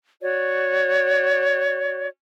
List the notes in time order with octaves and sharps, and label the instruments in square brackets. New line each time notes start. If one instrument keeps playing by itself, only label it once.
[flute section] F#4 C#5 D5